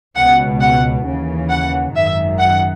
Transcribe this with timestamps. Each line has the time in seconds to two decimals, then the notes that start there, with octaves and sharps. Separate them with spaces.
0.16 C#2 B2 F#5
0.60 F#5
1.05 D#2 C#3 E3
1.50 F#5
1.95 G#1 F#2 D#3 E5
2.39 F#5